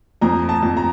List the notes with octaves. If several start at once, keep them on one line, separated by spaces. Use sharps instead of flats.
F2 A#5
A5
F2
A#5